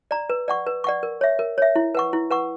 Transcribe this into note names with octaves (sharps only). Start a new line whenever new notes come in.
D5 A#5
B4
D5 F#5 C#6
B4
D5 F#5 C#6
A#4
C#5 E5
A#4
C#5 E5
E4
B4 F#5 C#6
E4
B4 F#5 C#6